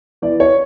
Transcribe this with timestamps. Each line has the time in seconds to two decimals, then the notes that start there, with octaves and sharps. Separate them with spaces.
0.22 E3 B3 E4 D5
0.40 C#5